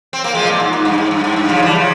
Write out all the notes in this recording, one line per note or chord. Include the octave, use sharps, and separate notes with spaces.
C4
A#3
F3 G#3
C3
A#2
G#2
G#2
G2
G#2
G2
G#2
G2
C#3 F3
E3 G3
C#3 F3